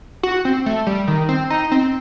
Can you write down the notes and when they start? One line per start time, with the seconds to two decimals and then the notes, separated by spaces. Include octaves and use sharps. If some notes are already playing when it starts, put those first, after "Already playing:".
0.23 F#4
0.45 C4
0.66 A3
0.87 G3
1.08 D#3
1.29 C4
1.50 D#4
1.71 C4